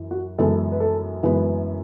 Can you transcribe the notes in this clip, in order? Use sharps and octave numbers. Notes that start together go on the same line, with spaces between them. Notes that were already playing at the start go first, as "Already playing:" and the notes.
Already playing: F#2 E3
F#4
F#2 E3 G#3 B3 A4
B4
A4
F#2 E3 G#3 B3 B4